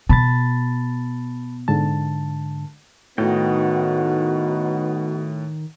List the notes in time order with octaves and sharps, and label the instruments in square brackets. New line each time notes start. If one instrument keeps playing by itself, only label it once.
[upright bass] B2 [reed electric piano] A5 B5 A6
[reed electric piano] G#2 D3 A5
[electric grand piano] A2 [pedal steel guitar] D#3 D#5 G5 [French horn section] B3 D#4 [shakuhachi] F#4